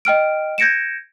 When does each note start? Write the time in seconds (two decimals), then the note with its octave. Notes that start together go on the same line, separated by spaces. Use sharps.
0.05 D#5 G5 F6 D7
0.58 G6 G#6 A#6 C#7 D7 E7